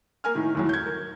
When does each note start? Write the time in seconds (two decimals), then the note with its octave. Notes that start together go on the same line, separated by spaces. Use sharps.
0.24 A#3 A#4 G#5 F6
0.35 A2 D#3
0.55 D#2 A2 F#3
0.69 G6 G#6
0.86 A#4